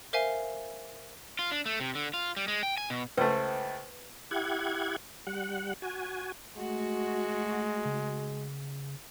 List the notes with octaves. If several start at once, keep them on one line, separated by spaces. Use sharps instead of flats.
A#4 C5 E5 F5 G#5
F4
D4
A3
C3
D3
F4
G3
G#3
G5
G#5
B2
C#2 A3 B4 C5
E4 G4 F#5 G#6
G3 F#5
F#4 G#5
G#3 A3 F#4
C#3